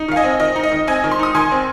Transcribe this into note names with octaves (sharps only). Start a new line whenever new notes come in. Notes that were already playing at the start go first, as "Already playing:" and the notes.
Already playing: D#4
D#3 F5
D#5 G#5
C4
D#3 D#5
D#4
D#5
D#3
C4 D#5 G#5
D#3
C6
D#4 D#6
D#3 G#5 C6
C4